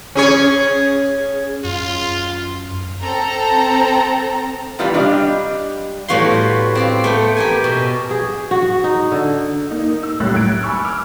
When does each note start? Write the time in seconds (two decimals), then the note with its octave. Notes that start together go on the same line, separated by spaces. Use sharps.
0.15 C#4 G#4 C#5
1.64 F#2 F4
3.00 C4 A4 A#5
4.79 D#3 E3 G3 B3 F4
4.94 G3 D4 G4 D5 D#5 F5
6.08 A2 G3 B3 F#4 F5 C6
6.75 C4 D5 F5
7.04 A3 B3 G5
7.37 G4 A#4 G#5
7.64 B2
8.11 G#4
8.51 F#4
8.84 D#4
9.12 D3
9.71 A#3 D#4
10.03 E6
10.20 F#1 C2 A2 E6 F#6 A6
10.35 F#6 G#6 D7
10.62 G#5 B5 C#6 E6 F6
10.84 D6 E6 F6